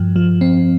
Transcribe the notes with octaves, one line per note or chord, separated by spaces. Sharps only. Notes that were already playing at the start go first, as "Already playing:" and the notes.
Already playing: G2 F3
F3
C4